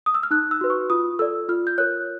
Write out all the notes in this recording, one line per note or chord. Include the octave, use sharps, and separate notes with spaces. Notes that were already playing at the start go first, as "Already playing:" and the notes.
D#6
E6
F6
D#4 F#6
E6
F#4 B4
C#6
F4 D#6
A4 D5 E6
F4 F6
G6
A#4 C#5 F#6